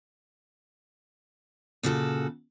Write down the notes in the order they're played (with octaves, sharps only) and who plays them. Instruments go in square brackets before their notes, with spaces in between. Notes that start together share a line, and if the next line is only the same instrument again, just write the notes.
[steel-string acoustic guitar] A#2 C#3 F#4 G#4 A4